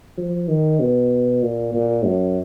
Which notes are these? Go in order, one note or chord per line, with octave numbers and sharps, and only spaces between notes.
F3
D#3
B2
A#2
A#2
F#2